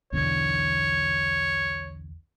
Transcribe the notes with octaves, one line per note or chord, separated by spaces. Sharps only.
B1 E2 D3 C#5